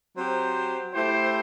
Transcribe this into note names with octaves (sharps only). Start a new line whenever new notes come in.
F#3 C4 G4 C5
A3 E4 G4 C5